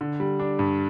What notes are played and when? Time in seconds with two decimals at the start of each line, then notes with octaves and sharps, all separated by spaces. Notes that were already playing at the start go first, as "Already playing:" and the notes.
0.01 D3
0.20 G3
0.39 D4
0.59 G2